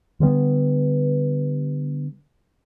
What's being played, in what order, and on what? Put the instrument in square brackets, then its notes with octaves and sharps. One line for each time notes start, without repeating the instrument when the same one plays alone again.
[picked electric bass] D3 G3 B3